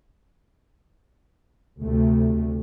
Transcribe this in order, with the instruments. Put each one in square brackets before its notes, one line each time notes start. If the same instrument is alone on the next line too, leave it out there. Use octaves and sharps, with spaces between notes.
[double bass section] D2 C3 A3